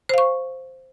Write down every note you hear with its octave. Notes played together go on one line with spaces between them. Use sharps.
C5 F5 C#6